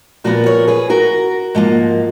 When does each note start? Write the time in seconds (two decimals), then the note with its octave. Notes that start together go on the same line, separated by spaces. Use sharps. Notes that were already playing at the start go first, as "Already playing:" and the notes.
0.24 A#2 F3 B3 F#4 A#4
0.46 A#4 C#5
0.67 G#4 B4
0.90 F#4 A#4
1.55 G#2 F3 A#3